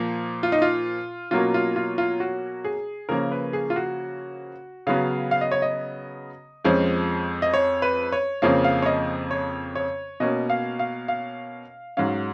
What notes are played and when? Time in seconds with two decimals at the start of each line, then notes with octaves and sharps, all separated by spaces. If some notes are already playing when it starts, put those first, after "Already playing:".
Already playing: A#2 F3 A#3
0.43 F4
0.52 D#4
0.62 F4
1.31 B2 F#3 A#3 C#4 F4
1.54 F4
1.76 F4
1.98 F4
2.20 F#4
2.65 G#4
3.09 C#3 F3 A#3 C#4 A#4
3.32 B4
3.53 G#4
3.70 F4
3.76 F#4
4.87 C#3 F#3 B3 F5
5.31 F5
5.41 D#5
5.52 C#5
5.62 D#5
6.64 F2 F3 G#3 C#4
7.42 D#5
7.54 C#5
7.82 B4
8.12 C#5
8.42 F2 C#3 F3 A#3 C#4 F5
8.64 F5
8.82 C#5
8.86 D#5
9.31 C#5
9.76 C#5
10.20 B2 A#3 C#4 D#5
10.50 F5
10.79 F5
11.08 F5
11.97 G#2 F#3 C#4 F5